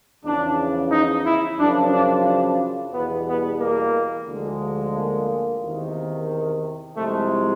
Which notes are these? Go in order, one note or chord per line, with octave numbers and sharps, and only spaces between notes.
E2 C#3 F3 D4
D#4
E4
F#2 C#3 F3 D4
D4
D4
E2 B2 G3 B3
B3
A#3
D2 D3 F3 G#3
A#3
E2 C3 D#3
C2 C3 F3 G#3 A3